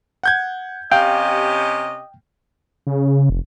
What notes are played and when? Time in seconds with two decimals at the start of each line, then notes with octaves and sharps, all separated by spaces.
0.23 F#5 G6 G#6
0.92 C3 C#4 G4 D#5 F5 G5
2.87 C#3
3.30 F1